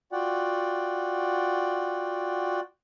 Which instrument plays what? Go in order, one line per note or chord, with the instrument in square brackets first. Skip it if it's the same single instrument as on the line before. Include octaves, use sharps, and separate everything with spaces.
[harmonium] F4 F#4 D5 F#5 G5